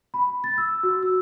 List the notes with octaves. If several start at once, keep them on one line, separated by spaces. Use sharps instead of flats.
B5
A6
E6
F#4
E6